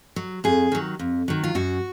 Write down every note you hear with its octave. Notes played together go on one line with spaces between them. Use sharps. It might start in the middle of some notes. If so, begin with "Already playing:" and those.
F#3
F2 G#4
D#3 F#3
F2
D#3 F#3
F4
F#2 F#4